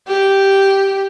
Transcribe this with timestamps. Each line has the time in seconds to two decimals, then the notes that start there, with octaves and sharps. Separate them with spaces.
0.08 G4